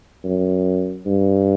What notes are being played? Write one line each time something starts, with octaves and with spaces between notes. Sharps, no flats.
F#2
G2